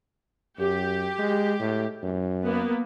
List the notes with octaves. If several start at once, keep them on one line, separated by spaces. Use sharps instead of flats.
F#2 G4
G#3
A2
F#2
A#3 B3